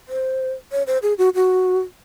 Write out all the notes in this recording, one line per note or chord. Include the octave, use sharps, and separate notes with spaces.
C5
C#5
C5
G#4
F#4
F#4